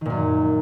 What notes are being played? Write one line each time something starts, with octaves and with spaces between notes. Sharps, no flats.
F#2 A#2 D#3